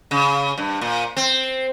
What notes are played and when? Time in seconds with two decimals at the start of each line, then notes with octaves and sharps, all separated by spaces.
0.11 C#3
0.58 G2
0.81 A#2
1.17 C4